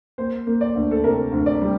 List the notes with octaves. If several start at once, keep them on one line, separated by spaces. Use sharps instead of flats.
A#3 C5
A#3
D5
D2
A4
C3 A#4
D2
D5
G3